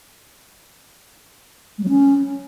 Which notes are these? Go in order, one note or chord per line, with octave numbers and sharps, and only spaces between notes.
G#3
F#3
C#4